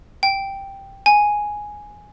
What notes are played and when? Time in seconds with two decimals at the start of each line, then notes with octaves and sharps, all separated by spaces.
0.23 G5
1.06 G#5